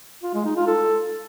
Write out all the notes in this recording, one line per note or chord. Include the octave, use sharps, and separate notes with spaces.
F4
G#3
D#4
F4
A4